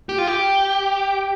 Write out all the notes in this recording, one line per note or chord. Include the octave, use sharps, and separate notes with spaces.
G4
F4
G4